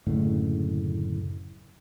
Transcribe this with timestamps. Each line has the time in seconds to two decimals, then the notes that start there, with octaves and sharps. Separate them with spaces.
0.06 F#1 D2 A2 C#3